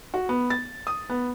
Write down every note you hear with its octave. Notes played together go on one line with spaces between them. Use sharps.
F#4
B3
A6
D#6
B3